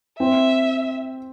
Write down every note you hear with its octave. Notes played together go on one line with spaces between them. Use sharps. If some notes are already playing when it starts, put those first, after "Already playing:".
C4 E5